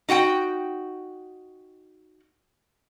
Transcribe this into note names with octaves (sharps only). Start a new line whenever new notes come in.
D#4 F#4 F#5 G5